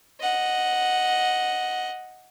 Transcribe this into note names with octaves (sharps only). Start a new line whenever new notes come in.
D#5 F#5